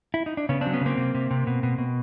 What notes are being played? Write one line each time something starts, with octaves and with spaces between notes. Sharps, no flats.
E4
D#4
D4
C#3 B3 C#4
F#3 C4 D4
B3 C#4
C#3 A#3 C4
C3
C3
C3
B2
B2
B2